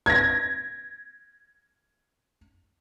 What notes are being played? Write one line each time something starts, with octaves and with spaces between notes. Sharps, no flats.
G#6 A#6